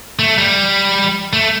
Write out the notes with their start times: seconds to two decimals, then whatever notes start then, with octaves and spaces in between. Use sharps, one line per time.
0.19 A3
0.38 G3
1.33 A3